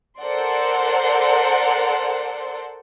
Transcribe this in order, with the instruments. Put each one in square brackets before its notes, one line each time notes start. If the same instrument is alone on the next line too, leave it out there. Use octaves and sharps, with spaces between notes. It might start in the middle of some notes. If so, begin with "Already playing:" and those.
[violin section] A4 A#4 C5 D5 F#5 C6